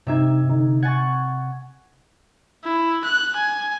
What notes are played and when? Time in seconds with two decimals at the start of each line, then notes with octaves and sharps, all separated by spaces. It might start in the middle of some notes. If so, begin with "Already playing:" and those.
0.07 G2 C3 D#4 E5 G#6
0.50 D3 D#4
0.83 F#5 G#5 C#6 G#6 A6
2.64 E4
3.04 F#6
3.36 G#5